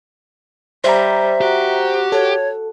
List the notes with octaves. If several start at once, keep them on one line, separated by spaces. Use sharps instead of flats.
G3 C5 E5 A#5
F#4 G4
A4 C#5